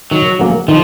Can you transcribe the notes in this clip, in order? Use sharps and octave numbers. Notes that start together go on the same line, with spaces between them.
D#3 F#3
F#3 A#3 C#4
D#3 F3